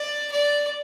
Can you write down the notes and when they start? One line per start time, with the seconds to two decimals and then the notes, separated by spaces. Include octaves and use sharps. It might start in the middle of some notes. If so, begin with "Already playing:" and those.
Already playing: D5
0.32 D5